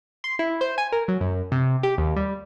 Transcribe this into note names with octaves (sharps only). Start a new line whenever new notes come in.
C6
E4
C5
G#5
A#4
F#3
F#2
C3
G4
D#2
G3